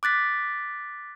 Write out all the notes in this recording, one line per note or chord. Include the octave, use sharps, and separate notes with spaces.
D6 F#6 A6 B6